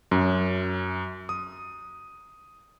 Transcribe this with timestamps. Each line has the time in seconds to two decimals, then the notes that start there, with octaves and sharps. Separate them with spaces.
0.11 F#2
1.29 D#6